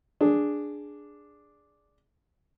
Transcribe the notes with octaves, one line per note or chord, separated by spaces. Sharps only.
D4 G#4